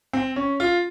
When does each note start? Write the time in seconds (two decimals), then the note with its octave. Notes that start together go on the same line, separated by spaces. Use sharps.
0.13 C4
0.36 C#4
0.60 F4